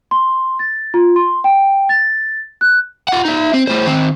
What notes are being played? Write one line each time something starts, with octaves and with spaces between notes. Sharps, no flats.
C6
A6
F4
C6
G5
A6
F#6
F4 F#5
D#4 E5
C4
A2 C5
D#3 C4